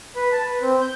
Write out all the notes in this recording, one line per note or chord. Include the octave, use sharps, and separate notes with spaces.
B4
A5
B4
C4
G6